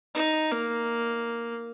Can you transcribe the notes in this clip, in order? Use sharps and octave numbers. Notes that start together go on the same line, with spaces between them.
D#4
A#3